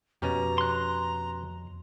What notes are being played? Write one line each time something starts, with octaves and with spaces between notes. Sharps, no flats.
F2 B2 C#4 G4 A#5
C6 F#6